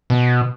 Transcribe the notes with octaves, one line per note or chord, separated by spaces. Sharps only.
B2